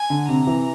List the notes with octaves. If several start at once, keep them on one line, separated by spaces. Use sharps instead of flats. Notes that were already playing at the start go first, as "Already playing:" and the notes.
Already playing: G#5
D3
C3 A#5
E3